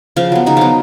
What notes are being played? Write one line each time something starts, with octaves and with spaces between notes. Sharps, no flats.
C#3 F3 F4
F#3 B3
C#3 D#4
F3 F#3 B3 F4